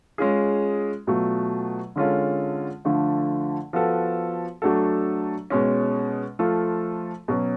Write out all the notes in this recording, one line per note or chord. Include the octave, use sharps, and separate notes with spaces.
G#3 C#4 F4 G#4
B2 F#3 A3 F4
D3 G#3 C#4 F4 A4
D3 F3 A3 D4
F3 B3 F#4 A4
F#3 A3 D4 F#4 A4
B2 G#3 C#4
F3 A3 F4 A4
B2 F#3 C#4